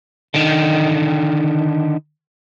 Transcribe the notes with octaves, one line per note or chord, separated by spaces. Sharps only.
D3 D#3